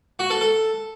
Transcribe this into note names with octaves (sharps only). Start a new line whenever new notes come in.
F#4
A4
A4